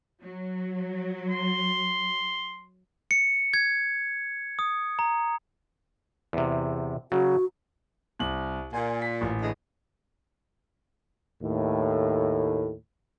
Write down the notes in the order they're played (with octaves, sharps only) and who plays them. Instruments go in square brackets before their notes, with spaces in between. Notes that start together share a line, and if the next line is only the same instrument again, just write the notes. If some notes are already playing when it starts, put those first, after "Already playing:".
[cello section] F#3
[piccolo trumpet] C6
[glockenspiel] C#7
G#6
D#6
A#5
[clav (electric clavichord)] E2 C3
[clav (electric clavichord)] C#3 F#3 [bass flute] F#4
[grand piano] C2 F#7
[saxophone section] A#2 [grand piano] G#5
[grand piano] B6
A1
[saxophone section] D3 E3 G#3
[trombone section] D#2 A2